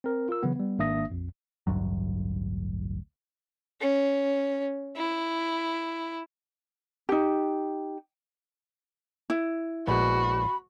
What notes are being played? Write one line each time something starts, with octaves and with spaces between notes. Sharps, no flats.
C4 A#4
F4 A#4 E6
C#3 E3 F#3 B3
G3 B3
G#1 A#3 D4 E5 D#6 A#6
A#1 F2
A1 D2 G2 F#3
C#4
E4
D#4 G4
E4
A#1 G#3 B3 F#4 B5